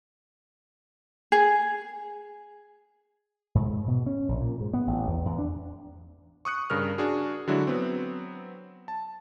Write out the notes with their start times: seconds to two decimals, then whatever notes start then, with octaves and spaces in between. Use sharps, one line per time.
1.32 G#4
3.55 G#2
3.88 B2
4.06 C#4
4.29 A#1
4.40 A#2
4.61 G#2
4.73 B3
4.87 A1
5.07 E2
5.25 E2
5.38 D4
6.45 C#6 D#6 F#6 C#7
6.70 G2 C#3 A#4 F6
6.98 D4 F#4 G#4
7.48 D3 F#3 G#3 D4 E4 F#4
7.67 F#3 B3 C4
8.88 A5